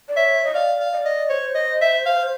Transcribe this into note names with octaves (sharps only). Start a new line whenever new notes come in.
D5
C#5 E5
D#5
D5 F5
F5
D#5
D5
D#5
C5 C#5
D#5
E5
F5